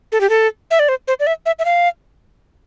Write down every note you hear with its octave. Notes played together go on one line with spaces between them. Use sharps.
A4
G4
A4
E5
D5
C5
C5
D5
E5
E5
E5
F5